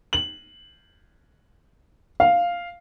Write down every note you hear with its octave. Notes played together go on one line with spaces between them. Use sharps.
F#7
F5